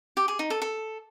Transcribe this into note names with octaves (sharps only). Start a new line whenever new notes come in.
G4
G#4
D#4
A4
A4